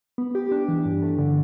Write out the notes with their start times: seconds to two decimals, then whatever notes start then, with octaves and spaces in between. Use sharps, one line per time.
0.18 B3
0.35 G4
0.52 D4
0.68 E3
0.85 G2
1.02 A3
1.19 D3